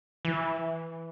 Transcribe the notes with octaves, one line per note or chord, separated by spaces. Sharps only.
E3